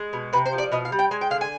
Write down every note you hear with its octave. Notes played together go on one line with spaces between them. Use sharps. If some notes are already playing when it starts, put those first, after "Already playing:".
Already playing: G#3
B2
C3 B4
C5
F3
D5
B2 D#5
F5
G3
G5
G#3 G#5
G5
D3 F5
G#5